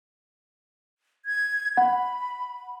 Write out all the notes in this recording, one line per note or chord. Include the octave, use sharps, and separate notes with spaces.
G#6
F#5 B5